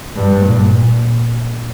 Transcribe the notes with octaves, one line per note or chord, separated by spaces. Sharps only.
G2
A#2